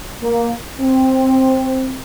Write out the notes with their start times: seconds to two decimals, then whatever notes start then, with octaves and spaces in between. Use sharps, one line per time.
0.22 A#3
0.80 C4